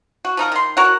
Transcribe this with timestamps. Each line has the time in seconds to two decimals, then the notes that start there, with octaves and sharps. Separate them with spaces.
0.25 F#4
0.37 F3 D#4 A#4
0.52 D#3 C6
0.77 F#4 A#4 C#5 F#5